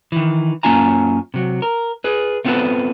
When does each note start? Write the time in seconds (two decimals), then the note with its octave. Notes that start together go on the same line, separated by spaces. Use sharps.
0.12 D#3 E3
0.63 F#2 A#3 C#4 F4 G#5 A#5
1.34 C3 F#3
1.62 A#4
2.04 G#4 B4
2.45 A3 B3 C4 F4 A4 B4